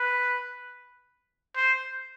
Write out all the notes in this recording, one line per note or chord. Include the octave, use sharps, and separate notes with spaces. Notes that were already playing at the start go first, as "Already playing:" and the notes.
Already playing: B4
C5